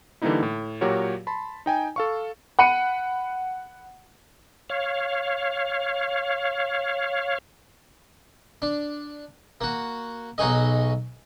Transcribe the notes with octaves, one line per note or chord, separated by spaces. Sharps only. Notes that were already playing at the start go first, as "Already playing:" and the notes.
D3 E3 G3 A#3 D#4 E4
A2
A#2 F#3 F#4 G4 A#4 C#5
A5 B5 C6
D#4 G5 G#5
A4 F5 C#6
F#5 B5 C#7 D#7
C#5 F5
D4
A#3 F#4
B1 D#4 F#4 G#4 D#5